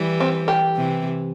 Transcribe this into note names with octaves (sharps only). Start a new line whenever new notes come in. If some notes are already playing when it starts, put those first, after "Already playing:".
Already playing: E3 G3
C4
G4
C3 E3